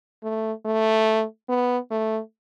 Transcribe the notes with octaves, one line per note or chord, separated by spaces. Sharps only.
A3
A3
B3
A3